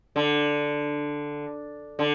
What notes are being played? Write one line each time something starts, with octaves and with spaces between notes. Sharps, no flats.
D3
D3